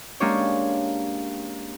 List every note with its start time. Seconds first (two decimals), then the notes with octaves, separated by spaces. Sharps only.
0.20 G#3 A#3 C#4 D4 G4 C#5